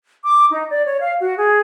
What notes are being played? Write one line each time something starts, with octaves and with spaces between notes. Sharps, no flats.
D6
D#4
D5
C#5
F5
F#4
G#4